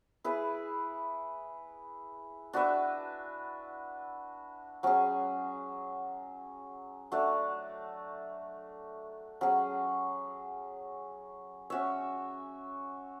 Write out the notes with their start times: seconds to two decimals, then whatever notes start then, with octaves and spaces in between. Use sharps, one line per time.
0.24 E4 G#4 B4
2.53 D4 F#4 B4 E5
4.83 F#3 C#4 G#4
7.12 A3 D4 F#4
9.41 F#3 C#4 G#4
11.70 C#4 F#4 C#5 E5